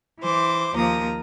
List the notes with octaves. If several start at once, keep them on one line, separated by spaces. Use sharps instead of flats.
E3 C5 D6
D#2 F3 A#3 A#5 D#6